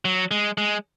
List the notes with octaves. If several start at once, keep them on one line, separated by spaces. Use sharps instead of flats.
F#3
G#3
G#3